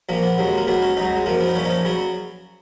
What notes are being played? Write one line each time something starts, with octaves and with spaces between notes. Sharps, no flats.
A#1 A#2 F3 A#3
B3
D#2 C#3 F#3
G#3
A#3
C#2 B2 F#3 B3
C#4
C#2 B2 F#3 D#4
G#3
F#2 F3 A#3
B3
D#4
A#1 A#2 F3 C#4
D#4
C#4
C#3 F#3 B3